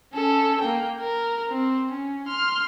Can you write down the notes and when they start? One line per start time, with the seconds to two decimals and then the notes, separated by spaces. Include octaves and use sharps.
0.13 C#4 A4
0.61 A#3 G5
1.01 A#4
1.49 C4
1.91 C#4
2.28 C6 F6